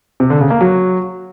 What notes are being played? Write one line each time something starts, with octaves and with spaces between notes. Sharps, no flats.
C3
D3
C#3
A#3
F#3